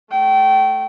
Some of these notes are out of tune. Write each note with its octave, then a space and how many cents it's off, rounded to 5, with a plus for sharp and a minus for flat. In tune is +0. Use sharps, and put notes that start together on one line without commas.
A3 +0 G5 -25